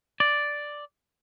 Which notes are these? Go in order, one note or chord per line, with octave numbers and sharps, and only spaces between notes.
D5